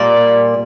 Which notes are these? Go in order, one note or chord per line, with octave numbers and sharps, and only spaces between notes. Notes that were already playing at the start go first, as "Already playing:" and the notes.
Already playing: A#2 G3 A#3 D5